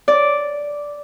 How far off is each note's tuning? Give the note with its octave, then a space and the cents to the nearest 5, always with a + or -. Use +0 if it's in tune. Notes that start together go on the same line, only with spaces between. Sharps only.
D5 -5